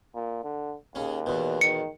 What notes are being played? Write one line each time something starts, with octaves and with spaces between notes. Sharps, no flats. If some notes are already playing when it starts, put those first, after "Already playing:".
A#2
D3
D#2 C#3 C#4
E2 B2
D#3 C#7